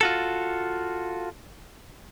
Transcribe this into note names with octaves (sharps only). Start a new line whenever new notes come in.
F4 F#4 A4